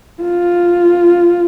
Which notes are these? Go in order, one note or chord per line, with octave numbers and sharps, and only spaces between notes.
F4